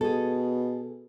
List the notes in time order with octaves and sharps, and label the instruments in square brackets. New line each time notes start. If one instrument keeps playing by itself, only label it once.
[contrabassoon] B2 [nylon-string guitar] G#4 A4